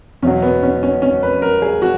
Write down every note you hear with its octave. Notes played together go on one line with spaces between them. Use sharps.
E2 B2 F#3 C#4
B3
C#4
C#4
C#4
B4
A#4
G#4
F#4